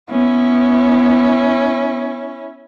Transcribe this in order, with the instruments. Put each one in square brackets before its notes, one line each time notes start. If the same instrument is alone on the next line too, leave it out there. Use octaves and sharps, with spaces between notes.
[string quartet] B3 [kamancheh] C#4 E4